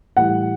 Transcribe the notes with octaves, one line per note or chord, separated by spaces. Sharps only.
A2 E3 G3 F#5